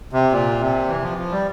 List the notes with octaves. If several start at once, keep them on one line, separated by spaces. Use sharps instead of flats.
C3
A#2
C3
E3
F3
F3
G3